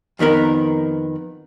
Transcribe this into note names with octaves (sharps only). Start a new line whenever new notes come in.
F2 D#3 B3 A#4